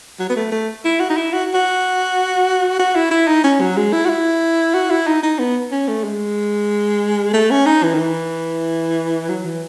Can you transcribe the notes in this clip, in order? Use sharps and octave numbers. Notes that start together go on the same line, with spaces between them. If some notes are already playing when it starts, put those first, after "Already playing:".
F#3
B3
A3
A3
E4
F#4
D#4
E4
F#4
F#4
F#4
E4
E4
D#4
C#4
F#3
G#3
E4
F#4
E4
F#4
E4
D#4
D#4
B3
C#4
A3
G#3
A3
C#4
D#4
E3
D#3
E3
F#3
E3